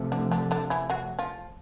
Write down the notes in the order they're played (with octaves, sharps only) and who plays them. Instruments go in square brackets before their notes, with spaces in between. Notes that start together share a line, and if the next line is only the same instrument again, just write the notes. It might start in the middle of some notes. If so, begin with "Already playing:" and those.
Already playing: [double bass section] C3 F3 A3
[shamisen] D3 D4
D3 D4
D3 D4
E3 E4
F#3 F#4
F3 F4